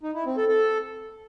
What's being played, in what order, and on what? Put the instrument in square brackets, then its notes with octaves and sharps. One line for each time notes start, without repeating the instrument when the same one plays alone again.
[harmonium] D#4
E4
C4
A4
A4